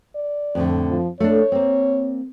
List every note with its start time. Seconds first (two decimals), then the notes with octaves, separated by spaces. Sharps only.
0.16 D5
0.55 F2 A2 D3
0.90 F3
1.20 A3 D4 C#5
1.52 A#3 C4